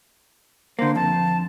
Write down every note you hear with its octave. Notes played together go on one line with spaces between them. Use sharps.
D3 A#3 C5
F2 A5